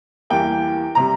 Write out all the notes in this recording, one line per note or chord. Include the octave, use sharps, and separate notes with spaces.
E2 E3 G3 A#3 G5
C3 G3 A#5